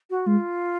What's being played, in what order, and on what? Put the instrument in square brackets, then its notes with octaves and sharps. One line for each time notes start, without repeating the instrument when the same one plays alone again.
[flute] F#4
[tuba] G#3 [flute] F4